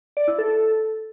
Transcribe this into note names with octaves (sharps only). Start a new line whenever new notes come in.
D5
E4
A4